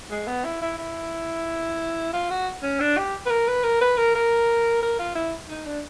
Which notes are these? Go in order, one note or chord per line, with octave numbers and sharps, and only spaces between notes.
G#3
B3
E4
E4
E4
F4
F#4
C#4
D4
G4
B4
A#4
B4
A#4
B4
A#4
A#4
A#4
F4
E4
D#4
D4